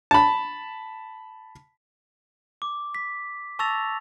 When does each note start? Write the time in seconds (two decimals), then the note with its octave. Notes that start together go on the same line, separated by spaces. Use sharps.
0.11 A5 B5
2.62 D6
2.95 B6
3.59 A5 C#6 E6 A6 A#6 F7